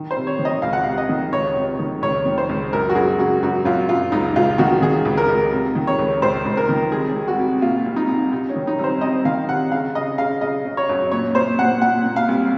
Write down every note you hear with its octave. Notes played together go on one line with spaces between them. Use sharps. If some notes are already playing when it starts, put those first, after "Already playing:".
Already playing: D#3
C5
C3
C#5
D#3
D#5
C#2 F5
F#5
F5
C3
D#5
D#3
C#2 C#5
C3
D#3
C#2 C#5
D#3
C5
C#2
F#2 A#4
F#4
F#2 G#4
C#3 F#4
F#2 F#4
F#2 F4
F#2 F4
C#2 D#4
C#2 F4
D#3 F#4
D#3 G#4
C#2
A#4
C#2
C3
D#3
C#5
C#2
C#2 C5
C#2
A#4
D#3
C2 G#4
C2
F#4
C2
A#2 F4
C2
D#4
C2
C3 D#4
C#4
D#3
D#4
C2
C5
C2 D#5
D#3 F5
C3 F#5
C#3 F5
C#3 D#5
C#3 F5
C#3 D#5
C#3
C#5
F#2
A#2 C#5
A#2 C5
A#2 F#5
A#2 F#5
A#2
F5
C2